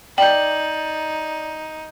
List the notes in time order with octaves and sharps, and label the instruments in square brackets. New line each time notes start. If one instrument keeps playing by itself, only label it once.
[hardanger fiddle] D#4 [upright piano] D5 [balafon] G5 [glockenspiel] G6 F#7